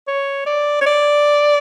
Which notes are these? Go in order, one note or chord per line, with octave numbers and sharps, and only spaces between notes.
C#5
D5
C#5
D5